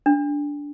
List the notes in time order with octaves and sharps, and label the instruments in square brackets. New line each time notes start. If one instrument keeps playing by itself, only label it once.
[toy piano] D4